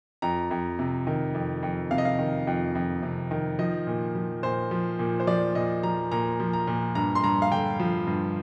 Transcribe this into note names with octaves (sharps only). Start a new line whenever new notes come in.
F2 A#5
F2
C3
D#3
F2
F2
C3 F5
D#5
F5
D#3
F2
F2
C3
D#3
F3 D#5
A#2
F3
A#2 C5
F3
A#2
C5
F3 D5
A#2 D#5
F3 A#5
A#2 A#5
F3
A#5
A#2
G2 A#5
C6
G2 A#5
F5
D3 G5
F3
G2